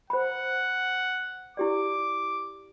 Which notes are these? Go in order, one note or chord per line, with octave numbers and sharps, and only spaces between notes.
C5 F#5 B5
E4 G4 D5 D6